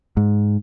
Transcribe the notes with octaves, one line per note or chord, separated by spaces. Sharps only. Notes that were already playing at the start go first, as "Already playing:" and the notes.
G#2